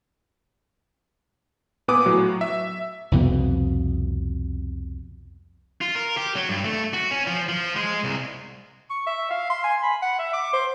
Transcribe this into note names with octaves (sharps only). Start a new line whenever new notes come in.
A#2 B3 B4 G#5 D6 D#6
A2 F#3 F#4
E5
C2 F2 B2 B3
F4
A#4
G4
F#3
G2
A3
F#4
C#4
F3
F3
G#3
C2
C#6
E5
F5
C6
G#5
B5
F#5
E5
D6
C5